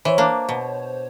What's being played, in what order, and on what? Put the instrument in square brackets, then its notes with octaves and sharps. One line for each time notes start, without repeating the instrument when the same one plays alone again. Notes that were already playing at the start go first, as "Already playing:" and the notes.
[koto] E3 [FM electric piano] C5 C#5
[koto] A#3 D4
B2